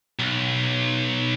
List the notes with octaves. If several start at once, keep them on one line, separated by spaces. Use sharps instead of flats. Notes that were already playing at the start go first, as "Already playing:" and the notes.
B1